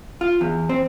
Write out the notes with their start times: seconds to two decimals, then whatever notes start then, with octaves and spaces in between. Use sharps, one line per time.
0.21 F4
0.41 E2
0.69 C4